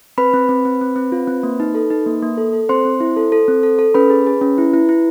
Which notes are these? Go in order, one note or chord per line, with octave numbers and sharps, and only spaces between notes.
C4 B4 B5
C4
C4
C4
C4
C4
F4
C4
A#3
D#4
A4
D#4
A#3
A#3
A4
A4
C4 C5 C6
C4
E4
A4
A4
C4
A4
A4
C#4 B4 B5
G#4
G#4
C#4
E4
E4
E4